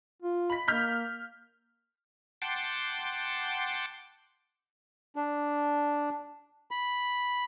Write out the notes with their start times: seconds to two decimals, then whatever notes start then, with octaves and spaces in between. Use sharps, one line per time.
0.22 F4
0.50 B5 B6
0.68 A#3 F6 G6 B6
2.42 F#5 G5 A5 C6 D6
5.16 D4
6.71 B5